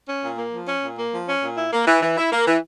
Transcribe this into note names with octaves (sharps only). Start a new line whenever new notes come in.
C#4
A#2
A#3
F3
C#4
A#2
A#3
F3
C#4
A#2
E4
A#3
E3
E3
E4
A#3
E3